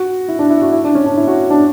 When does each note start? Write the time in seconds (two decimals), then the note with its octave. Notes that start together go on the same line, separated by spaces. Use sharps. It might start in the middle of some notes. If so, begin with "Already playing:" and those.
Already playing: F#4
0.28 E4
0.39 D4
0.50 E4
0.61 F#4
0.72 E4
0.84 D4
0.95 C#4
1.06 D4
1.17 E4
1.27 F#4
1.50 D4